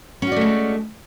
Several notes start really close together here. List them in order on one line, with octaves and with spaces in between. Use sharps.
C#4 F#4 D5 A3 G#3